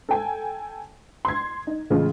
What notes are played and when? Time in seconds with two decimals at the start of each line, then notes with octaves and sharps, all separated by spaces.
0.09 A4 G5 G#5
1.25 C6 G#6
1.67 D#4
1.90 A2 C#3 E3 G#3 F4